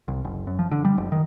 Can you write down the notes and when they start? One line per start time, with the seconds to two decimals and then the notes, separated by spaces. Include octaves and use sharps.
0.08 C2
0.25 F#1
0.47 F#2
0.59 F3
0.71 D3
0.85 G3
0.98 F#1
1.12 D#3